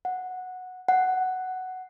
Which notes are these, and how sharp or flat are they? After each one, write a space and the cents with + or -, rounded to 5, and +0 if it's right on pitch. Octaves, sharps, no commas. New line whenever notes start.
F#5 -10
F#5 +5